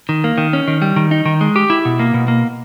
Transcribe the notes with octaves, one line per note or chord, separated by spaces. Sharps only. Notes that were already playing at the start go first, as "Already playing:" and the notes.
D#3
A#3
D#3
C#4
D#3
G3
D#3
D#4
D#3
G#3
G4
E4
B2
A#3
B2
A#3